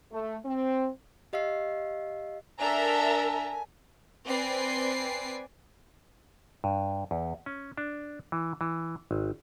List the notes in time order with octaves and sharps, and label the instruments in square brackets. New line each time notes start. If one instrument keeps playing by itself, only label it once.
[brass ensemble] A3
C4
[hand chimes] G4 D#5 F5 E6 C7
[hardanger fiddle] D4 A4 [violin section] A#4 E5 A#5 [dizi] G#5
[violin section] C4 B4 D5 G#5 C7
[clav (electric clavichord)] G2
E2
C#4
D4
E3
E3
G#1